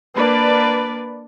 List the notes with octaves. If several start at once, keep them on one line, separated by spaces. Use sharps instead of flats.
A#3 D4 B4 D5